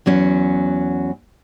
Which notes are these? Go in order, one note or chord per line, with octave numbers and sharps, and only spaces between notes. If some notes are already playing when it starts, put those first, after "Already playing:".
E2 F#3 C#4